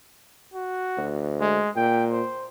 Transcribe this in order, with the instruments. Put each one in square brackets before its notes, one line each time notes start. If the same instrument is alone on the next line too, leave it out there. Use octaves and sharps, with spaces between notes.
[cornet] F#4
[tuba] D2
[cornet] G#3
[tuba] A#2 [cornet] G5
[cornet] C5